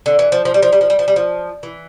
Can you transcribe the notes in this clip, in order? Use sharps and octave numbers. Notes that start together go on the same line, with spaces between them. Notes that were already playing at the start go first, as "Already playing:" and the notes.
D3
E3
F3
F3
G3
F3
G3
F3
G3
F3
G3
F3
E3